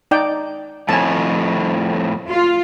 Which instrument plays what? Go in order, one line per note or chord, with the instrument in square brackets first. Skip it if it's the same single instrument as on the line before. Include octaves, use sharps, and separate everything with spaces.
[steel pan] D#4 D5 G5
[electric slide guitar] F2 A2 [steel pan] G#5 A5
[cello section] F4